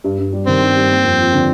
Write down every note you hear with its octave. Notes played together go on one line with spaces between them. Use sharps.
G2
G2
G3
D#3 C4
G2
G2
A#3
F2
F3
D3